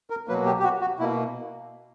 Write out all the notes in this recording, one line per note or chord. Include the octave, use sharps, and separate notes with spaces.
A#4
B2 F#3 A#3 B4
G4
G4
F#4
F#4
B2 A#3 E4